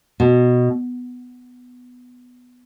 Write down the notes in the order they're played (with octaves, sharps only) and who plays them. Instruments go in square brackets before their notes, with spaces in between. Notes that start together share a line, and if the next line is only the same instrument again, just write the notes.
[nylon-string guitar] B2